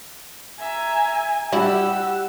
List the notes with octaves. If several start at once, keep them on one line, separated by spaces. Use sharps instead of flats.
E5 G#5 A#5
G3 D4 E4 F#4 G4 F#5 E6